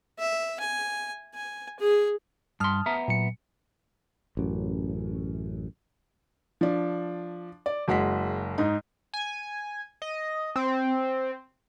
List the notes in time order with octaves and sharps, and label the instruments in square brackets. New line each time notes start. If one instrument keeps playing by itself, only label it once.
[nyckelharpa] E5
G#5
G#5
G#4
[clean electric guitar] G2 C6 [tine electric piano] A5 D#6 F6
[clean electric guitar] B3 E5 A#5
[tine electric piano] A#2 F#3 C#7
[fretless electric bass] A1 F#2
[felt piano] F3 D4
D5
F#1 G#3 F#4 B6
G#2 D#4
[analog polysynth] G#5
D#5
C4